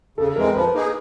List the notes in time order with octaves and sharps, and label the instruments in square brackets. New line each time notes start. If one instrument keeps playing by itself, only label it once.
[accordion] C#3 [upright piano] A4
[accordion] E3 G#3 C4 [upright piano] A#4
[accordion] F3 [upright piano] B4
[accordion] A#3 D#4 G#4